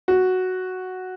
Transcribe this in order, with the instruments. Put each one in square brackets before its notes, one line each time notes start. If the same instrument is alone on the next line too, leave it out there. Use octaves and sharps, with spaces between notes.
[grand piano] F#4